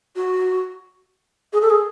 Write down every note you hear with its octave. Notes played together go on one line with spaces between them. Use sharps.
F#4
G#4
A4
G#4